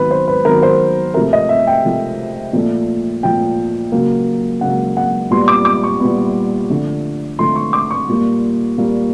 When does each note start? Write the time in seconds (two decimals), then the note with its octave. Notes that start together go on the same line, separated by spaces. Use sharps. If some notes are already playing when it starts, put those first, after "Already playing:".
Already playing: D#3 F#3 B3 B4
0.11 C5
0.28 B4
0.45 D#3 F#3 B3 A#4
0.63 C5
1.14 C3 F3 A3 A#4
1.33 D#5
1.49 E5
1.67 G5
1.84 C3 F3 A3
2.53 A#2 F3 A3
3.23 A#2 F3 A3 G5
3.92 C#3 F#3 A#3
4.61 C#3 F#3 A#3 F#5
4.97 F#5
5.30 A#2 G3 B3 C6
5.48 D6
5.65 D6
5.84 C#6
6.00 A#2 G3 B3
6.70 D3 F3 A3
7.39 D3 F3 A3 C6
7.56 C#6
7.73 D6
7.91 C#6
8.08 A#2 G3 A#3
8.78 A#2 G3 A#3